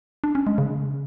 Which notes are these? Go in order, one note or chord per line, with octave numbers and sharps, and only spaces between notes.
D4
C#4
G#3
C#3